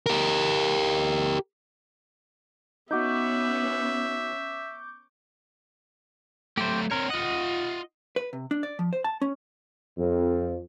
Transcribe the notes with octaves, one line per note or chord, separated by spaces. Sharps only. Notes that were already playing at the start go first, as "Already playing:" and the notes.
G4 A#4
B3 C#4 D#4 F#4 E5 C#6 D6 G6
F#3 A3 G4 C5
C4 A#4 C#5
F4 D#5 F#5
B4
C3
D4
D5
F3
C5
A5
C#4
F2